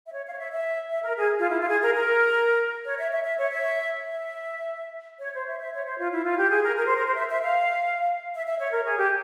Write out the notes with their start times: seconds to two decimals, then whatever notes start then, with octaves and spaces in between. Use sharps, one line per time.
0.07 E5
0.12 C#5
0.25 F5
0.32 C#5
0.38 E5
0.51 E5
0.89 E5
1.03 A#4
1.17 G#4
1.39 F4
1.49 E4
1.59 F4
1.68 G#4
1.82 A#4
1.94 A#4
2.85 C#5
2.98 E5
3.11 E5
3.24 E5
3.38 C#5
3.51 E5
4.02 E5
5.20 C#5
5.33 C5
5.46 E5
5.59 E5
5.73 C#5
5.85 C5
5.98 F4
6.11 E4
6.24 F4
6.38 G4
6.50 G#4
6.63 A#4
6.76 A#4
6.86 C5
6.96 A#4
7.06 C5
7.15 E5
7.29 E5
7.42 F5
8.34 E5
8.45 E5
8.60 C#5
8.72 A#4
8.85 G#4
8.98 G4